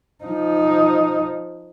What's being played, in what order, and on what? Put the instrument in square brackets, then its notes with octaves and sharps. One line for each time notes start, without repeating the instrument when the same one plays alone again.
[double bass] F3 D#4